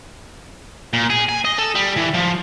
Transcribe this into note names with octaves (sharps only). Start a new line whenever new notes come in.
A#2
G#4
G#5
D#5
A4
G3
E3
F3